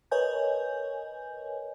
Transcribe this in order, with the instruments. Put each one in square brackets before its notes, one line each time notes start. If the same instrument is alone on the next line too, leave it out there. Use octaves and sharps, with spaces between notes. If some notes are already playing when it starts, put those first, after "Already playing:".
[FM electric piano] A#4 B4 C#5 D#5 G#5 G6